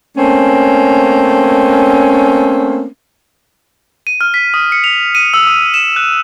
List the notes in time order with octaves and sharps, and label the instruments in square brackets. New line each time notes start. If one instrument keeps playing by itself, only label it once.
[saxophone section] A3 A#3 C4 C#4
[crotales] D#7
F6
B6
D#6
C#7
F7
D#7
E6
D#6
E7
F#6